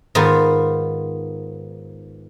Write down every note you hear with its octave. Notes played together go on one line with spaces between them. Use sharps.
G#2 D#3 B3 F4